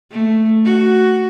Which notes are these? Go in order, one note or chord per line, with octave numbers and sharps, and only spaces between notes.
A3
F#4